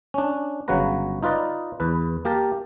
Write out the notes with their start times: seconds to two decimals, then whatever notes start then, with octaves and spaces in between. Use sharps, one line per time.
0.14 C#4 D4
0.68 G1 C#3 F#3 F#4 B4 A#5
1.23 D#4 F4 B4 D5 D#5
1.80 E2 B4
2.25 A#3 G4 A#4 A5